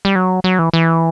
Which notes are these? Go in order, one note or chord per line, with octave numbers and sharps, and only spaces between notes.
G3
F#3
F#3
E3
E3